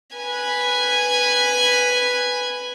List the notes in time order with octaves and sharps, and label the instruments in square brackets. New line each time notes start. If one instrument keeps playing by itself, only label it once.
[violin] B4 G#5